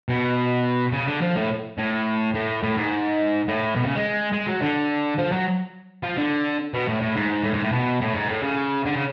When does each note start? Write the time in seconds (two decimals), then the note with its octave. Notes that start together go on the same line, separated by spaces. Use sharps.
0.09 B2
0.92 C#3
1.07 D3
1.21 F3
1.36 A2
1.78 A2
2.35 A2
2.63 A2
2.76 G#2
3.48 A2
3.76 B2
3.86 C#3
3.95 G#3
4.32 G#3
4.47 F#3
4.61 D3
5.18 F3
5.32 F#3
6.03 F3
6.17 D3
6.74 B2
6.88 A2
7.01 A2
7.16 G#2
7.44 A2
7.53 G#2
7.63 A2
7.72 B2
8.01 A2
8.15 G#2
8.29 A2
8.43 C#3
8.86 D3
8.95 C#3